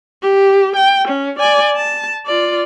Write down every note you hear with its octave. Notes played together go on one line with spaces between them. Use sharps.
G4
G5
C#4
D5 G#5
A5
F4 D5